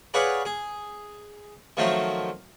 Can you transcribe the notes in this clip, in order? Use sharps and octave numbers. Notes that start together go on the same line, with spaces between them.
G#4 B4 C#5 D5 F5 F#5
G#4
D#3 F3 F#3 A3 C4 F4